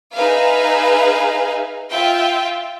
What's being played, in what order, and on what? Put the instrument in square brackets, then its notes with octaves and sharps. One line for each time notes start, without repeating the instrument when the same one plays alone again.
[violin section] D#4 G#4 B4 E5 F5
F4 E5 G5